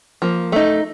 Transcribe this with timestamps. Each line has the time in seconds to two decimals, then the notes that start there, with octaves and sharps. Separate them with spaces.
0.22 F3 A#3
0.52 A3 D#4